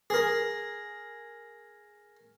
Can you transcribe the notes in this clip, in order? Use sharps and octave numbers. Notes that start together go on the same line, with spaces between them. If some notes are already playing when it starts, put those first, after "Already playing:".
G#4 A#4